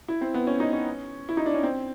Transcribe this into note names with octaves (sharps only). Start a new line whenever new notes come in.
E4
C4
B3
C#4
D#4
C#4
E4
D#4
D4
C#4
C4